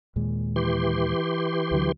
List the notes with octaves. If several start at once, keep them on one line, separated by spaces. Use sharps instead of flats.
D#2 A#2 G#3
E3 G4 C6
D2 D3 F#3